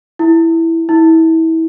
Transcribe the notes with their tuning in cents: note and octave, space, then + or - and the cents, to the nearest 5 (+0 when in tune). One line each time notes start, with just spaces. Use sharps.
E4 +0
E4 -30